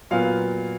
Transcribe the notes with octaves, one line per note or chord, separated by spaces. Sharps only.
A#2 F#3 B3 F5